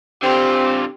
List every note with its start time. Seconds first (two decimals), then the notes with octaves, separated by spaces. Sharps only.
0.22 D3 C4 F4 G4